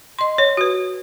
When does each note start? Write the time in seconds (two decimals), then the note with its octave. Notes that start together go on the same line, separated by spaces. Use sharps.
0.19 D#5 C6
0.38 C#5
0.57 F#4 B4